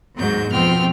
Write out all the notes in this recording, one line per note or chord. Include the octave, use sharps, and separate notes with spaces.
D#2 G#2 F#3 G#3 G6
F2 B2 F3 C4 G5 F6